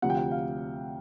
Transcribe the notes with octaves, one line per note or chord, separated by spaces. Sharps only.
D2 C3 F3 F#5
G5
F#5
F5